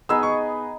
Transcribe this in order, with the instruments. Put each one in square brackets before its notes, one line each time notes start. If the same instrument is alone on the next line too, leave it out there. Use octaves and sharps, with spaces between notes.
[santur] B3 D#4 G#4 D#5 [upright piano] E6
[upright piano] C#6